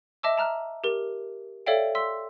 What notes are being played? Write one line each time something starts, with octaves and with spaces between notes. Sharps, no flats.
D#5 E5 A5 D6 E6
A5 A#5 F6 F#6
G4 A#4
A4 C#5 D5 E5 F5 G5
C6 E6 B6